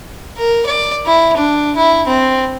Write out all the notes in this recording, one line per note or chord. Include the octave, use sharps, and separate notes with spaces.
A#4
D5
E4
D4
E4
C4